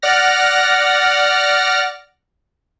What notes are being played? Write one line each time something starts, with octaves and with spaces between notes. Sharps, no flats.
D5 F#5 F6 A#6